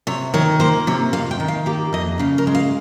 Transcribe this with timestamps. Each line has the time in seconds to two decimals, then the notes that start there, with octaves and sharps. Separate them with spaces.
0.07 C3 C#5
0.34 D#3 C#5
0.60 A#3 C5
0.87 C3 C#5
1.13 F2 F5
1.31 G5
1.40 D#3
1.48 F5
1.66 A#3 G4
1.93 F2 D#5
2.19 C#3 F5
2.38 A#4
2.47 G#3
2.55 F5